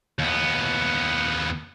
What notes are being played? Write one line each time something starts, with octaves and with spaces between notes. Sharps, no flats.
D#2 B3